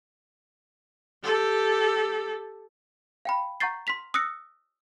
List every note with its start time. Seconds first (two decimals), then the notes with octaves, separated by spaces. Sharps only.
1.23 G4 A4
3.25 F5 G5 B5
3.60 F#5 A#5 C#6 G6 A6 C7
3.87 C6 F6 B6 F7
4.14 D#6 E6 F#6 A#6 C#7